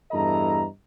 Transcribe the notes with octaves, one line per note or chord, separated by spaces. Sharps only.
E2 G2 E4 A4 D#5 A#5